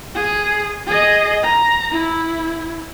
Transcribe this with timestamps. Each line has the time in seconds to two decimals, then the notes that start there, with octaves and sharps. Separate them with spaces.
0.15 G#4
0.87 G#4 D#5
1.43 A#5
1.91 E4